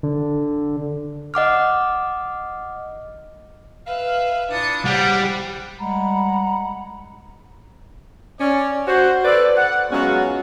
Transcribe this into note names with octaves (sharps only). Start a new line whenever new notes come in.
D3
D#5 F#5 D6 F6
B4 E5 F5
A#2 D4 E4 D#6 C#7
A2 C#3 G3 C5 F#5 D7
G3 G#3 F#5 A#5 B5
C#4 C#5 D5
F#4 C5
A4 B4 C5 D5
F#5
F#3 G#3 B3 C#4 F4 F#4